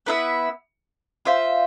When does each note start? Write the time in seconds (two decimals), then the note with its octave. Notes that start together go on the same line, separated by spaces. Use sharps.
0.06 B3 E4 B4 E5
1.25 F4 C5 E5